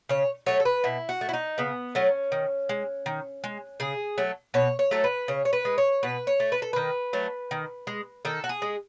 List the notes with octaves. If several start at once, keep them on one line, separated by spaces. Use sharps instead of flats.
C#3 C#5
F#3 A3 C#5
A4
B4
B2 E4
F#4
A3
E4
D#4
C#3 B3
F#3 A3 C#4
D#3
G#3
D#3
G#3
C#3 G#4
F#3 A3
B2 C#5
C#5
F#3 A3 A4
B4
C#3 C#5
C#5
B4
G#3
C#5
B2 B4
C#5
A3
B4
A4
D#3 B4
F#3 A3
D#3
G#3
D#3 A4
F#4
G#4
G#3